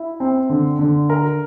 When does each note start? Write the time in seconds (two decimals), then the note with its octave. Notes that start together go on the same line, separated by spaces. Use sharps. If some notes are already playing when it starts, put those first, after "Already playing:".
Already playing: E4
0.20 C4
0.50 D3
0.79 D3
1.10 A#4